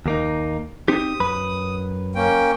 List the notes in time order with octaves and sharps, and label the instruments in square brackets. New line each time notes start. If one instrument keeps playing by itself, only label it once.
[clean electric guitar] D#2 A#3 D#4
[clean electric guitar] C4 D#4 G4 [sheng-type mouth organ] D#6
[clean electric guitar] F#2 B4 B5
[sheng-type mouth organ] A#3 C#4 G5